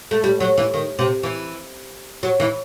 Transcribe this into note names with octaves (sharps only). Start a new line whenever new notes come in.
A3
G3
F#3
E3
D#3
C3
E3
F#3
E3